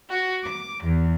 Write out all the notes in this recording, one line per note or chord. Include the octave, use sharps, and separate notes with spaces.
F#4
D6
E2